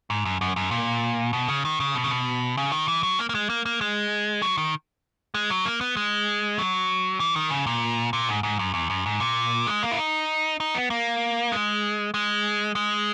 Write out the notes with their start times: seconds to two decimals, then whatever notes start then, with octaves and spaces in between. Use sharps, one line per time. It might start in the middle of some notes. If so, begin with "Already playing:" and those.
0.10 G#2
0.25 F#2
0.41 F#2
0.56 F#2
0.71 A#2
1.33 B2
1.48 C#3
1.65 D#3
1.80 C#3
1.95 B2
2.04 C#3
2.11 B2
2.57 C#3
2.72 D#3
2.88 E3
3.03 F#3
3.19 A#3
3.29 A#3
3.34 G#3
3.50 A#3
3.66 A#3
3.81 G#3
4.42 F#3
4.57 D#3
5.34 G#3
5.51 F#3
5.65 A#3
5.81 B3
5.97 G#3
6.58 F#3
7.20 E3
7.36 D#3
7.50 C#3
7.66 A#2
8.13 A#2
8.28 G#2
8.43 G#2
8.59 F#2
8.74 E2
8.90 F#2
9.06 G#2
9.20 A#2
9.67 G#3
9.83 A#3
9.91 E4
9.98 D#4
10.60 D#4
10.75 B3
10.90 A#3
11.52 G#3
12.14 G#3
12.75 G#3